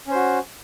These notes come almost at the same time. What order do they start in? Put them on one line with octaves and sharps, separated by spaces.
C#4 C5 F#4